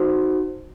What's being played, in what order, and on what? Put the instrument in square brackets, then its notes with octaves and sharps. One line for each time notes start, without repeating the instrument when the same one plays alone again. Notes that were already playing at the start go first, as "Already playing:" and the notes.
Already playing: [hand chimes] D#4 F#4 C5